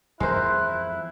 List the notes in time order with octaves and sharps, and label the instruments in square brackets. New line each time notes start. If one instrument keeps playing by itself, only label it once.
[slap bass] F2 E3 F3 [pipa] G#3 A#4 C5 [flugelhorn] E4 [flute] F#6